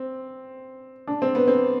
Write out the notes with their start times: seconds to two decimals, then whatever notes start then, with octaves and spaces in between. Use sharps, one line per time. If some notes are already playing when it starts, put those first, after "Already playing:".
Already playing: C4
1.07 D4
1.22 C4
1.35 B3
1.48 C4